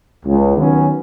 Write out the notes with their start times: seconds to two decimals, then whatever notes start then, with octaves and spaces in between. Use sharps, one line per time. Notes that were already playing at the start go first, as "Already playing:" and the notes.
0.25 C#2
0.56 D#3 F#3 B3 C#4